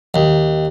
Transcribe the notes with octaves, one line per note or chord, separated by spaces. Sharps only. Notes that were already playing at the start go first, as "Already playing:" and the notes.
D#2